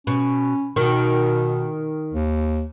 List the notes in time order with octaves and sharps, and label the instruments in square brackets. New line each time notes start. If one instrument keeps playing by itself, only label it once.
[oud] B2 [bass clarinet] C#4
[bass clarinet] B2 [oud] D#3
[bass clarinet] D#2